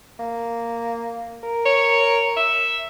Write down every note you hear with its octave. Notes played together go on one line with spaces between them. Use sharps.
A#3
A#4
C#5
E5